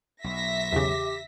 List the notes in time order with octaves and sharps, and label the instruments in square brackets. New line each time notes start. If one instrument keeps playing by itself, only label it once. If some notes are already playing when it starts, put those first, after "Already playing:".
[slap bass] B1 [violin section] E5 A#6 B6
[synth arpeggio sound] E2 C#3 [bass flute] G4